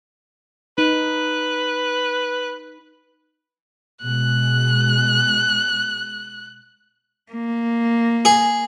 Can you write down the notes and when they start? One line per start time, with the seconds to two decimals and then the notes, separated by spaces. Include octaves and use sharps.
0.78 D#4 B4
4.03 B2 G#3 F#6
7.32 A#3
8.25 G#4